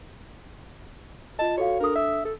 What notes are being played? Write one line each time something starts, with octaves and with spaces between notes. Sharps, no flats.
F4 D#5 A5
F#4 A4 C#5 F5
D4 A4 A#4 D#6
E5
A4